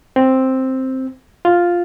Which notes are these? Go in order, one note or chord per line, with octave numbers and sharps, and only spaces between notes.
C4
F4